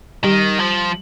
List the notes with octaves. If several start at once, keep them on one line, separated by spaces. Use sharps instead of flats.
D#3 G3 G4
F3